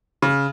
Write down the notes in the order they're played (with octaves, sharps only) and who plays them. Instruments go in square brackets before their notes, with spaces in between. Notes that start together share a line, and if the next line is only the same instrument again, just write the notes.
[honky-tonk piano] C#3